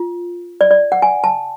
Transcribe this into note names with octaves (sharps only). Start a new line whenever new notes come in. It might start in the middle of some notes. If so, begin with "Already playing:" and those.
Already playing: F4
D5
D5
F#5
G#5
A5